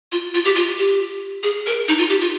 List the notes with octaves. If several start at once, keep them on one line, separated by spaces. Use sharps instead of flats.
F4
F4
G4
F4
G4
G#4
A#4
D#4
F4
G4
F4